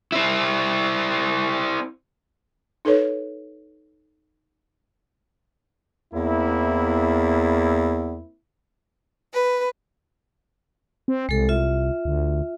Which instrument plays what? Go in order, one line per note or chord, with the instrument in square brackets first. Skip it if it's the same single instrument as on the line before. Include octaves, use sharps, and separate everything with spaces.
[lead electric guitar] C4 E4
[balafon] D#4 A4 B4 C#5
[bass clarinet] E2 [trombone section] A#3 C4 E4
[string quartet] B4
[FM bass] C4
[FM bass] C2 [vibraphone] G#3 A4
[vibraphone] F4 E5
[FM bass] D2